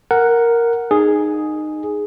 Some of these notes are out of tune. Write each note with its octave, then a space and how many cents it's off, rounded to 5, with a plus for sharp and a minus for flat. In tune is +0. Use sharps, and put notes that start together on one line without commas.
A#4 +0 F#5 +0
D#4 -20 G#4 +0